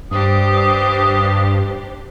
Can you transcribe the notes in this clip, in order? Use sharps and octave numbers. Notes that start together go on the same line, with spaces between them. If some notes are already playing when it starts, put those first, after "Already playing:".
G2 D4 G4 C5 D#6